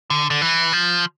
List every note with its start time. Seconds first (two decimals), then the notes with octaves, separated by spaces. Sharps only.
0.10 D3
0.30 D3
0.42 E3
0.73 F3